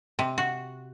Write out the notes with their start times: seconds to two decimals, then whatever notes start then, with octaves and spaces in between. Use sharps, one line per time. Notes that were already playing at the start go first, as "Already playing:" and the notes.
0.19 C3
0.38 F#4